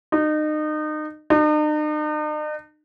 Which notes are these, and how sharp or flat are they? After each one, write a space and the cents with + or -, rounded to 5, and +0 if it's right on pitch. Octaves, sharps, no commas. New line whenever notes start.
D#4 -30
D#4 -45